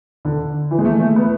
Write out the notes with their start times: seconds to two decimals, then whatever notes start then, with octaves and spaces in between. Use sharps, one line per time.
0.25 D3
0.71 E3
0.79 G#3
0.85 A3
1.00 A3
1.16 B3